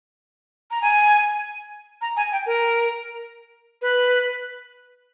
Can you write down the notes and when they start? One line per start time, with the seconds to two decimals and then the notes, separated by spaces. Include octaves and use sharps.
0.71 A#5
0.82 G#5
2.01 A#5
2.17 G#5
2.32 G5
2.46 A#4
3.82 B4